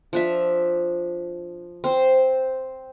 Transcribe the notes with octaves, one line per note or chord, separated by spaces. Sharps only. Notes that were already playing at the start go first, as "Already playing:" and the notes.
F3 D4 E5
C4 C5